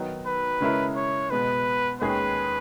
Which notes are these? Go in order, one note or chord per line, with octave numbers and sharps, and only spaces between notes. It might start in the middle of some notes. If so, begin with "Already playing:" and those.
Already playing: D#3 F#3 B3 D#4
B4
C#3 G#3 C#4 E4 A#4
C#5
B2 G#3 B3 B4
D#2 D#3 G#3 C#4 G#4 B4